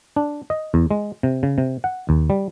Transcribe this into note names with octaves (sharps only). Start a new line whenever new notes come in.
D4
D#5
E2
G#3
C3
C#3
C3
F#5
D#2
G3